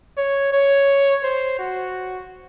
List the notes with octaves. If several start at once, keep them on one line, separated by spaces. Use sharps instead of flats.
C#5
C#5
C5
F#4